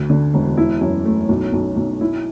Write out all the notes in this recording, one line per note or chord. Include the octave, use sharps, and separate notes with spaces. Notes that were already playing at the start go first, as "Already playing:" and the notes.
Already playing: D2
D3
E1
E4
F#2
A3
B1
B1
B1
E4